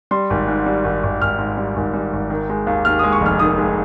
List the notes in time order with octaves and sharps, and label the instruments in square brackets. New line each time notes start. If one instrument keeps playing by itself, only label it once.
[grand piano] G3 C6
G#1
G#2
G3
G#1
G#1
G#1 F6
G#2
G3
G#1
G3
G#1
D#3
G#3
D#2
D#2 F6
G#3 D#6
C#6
F1 F6
D#3 D#6
G#3